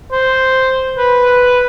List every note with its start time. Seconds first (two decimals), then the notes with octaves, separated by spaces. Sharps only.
0.12 C5
0.98 B4